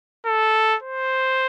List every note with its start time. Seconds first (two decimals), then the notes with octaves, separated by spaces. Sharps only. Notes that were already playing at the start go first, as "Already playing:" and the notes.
0.26 A4
0.82 C5